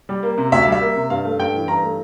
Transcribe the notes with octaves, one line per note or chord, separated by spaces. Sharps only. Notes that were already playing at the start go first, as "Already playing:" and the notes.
G3
A#3
C3
D2 E5
G3 F5
E5
A#3
C3
G2 F5
A3
G2 G5
E3
G2 A#5
A3